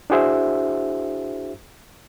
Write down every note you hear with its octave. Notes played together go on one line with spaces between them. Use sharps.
D4 E4 F#4 G#4 C5 E5